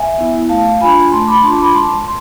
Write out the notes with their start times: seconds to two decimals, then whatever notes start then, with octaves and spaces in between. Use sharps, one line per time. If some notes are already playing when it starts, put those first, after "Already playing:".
Already playing: E5 G#5
0.18 B3 E4
0.49 A3 F5 A5
0.81 D4 F4 G#5 B5
1.12 A3 A5 C6
1.27 B5 D6
1.43 D4 F4 A5 C6
1.59 B5 D6
1.74 G#3 A5 C6
2.05 C6